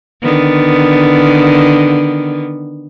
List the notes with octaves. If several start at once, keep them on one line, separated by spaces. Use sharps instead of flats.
D3 D#3 B3